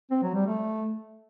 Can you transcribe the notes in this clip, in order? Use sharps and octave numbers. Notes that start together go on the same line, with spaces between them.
C4
F#3
G3
A3